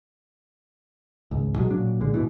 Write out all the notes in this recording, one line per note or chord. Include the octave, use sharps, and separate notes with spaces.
G#1 C#2
B2 F#3 G#3
A#2 F#3 D4
B1 A#2 D3 G#3
G#2 B2 E3